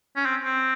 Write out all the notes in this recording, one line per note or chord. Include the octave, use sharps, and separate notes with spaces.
C#4
C4
C4